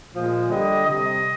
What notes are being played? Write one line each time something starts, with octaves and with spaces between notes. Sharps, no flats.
A#2 F3 G#3
D3 G3 D#5
C3 G3 D#5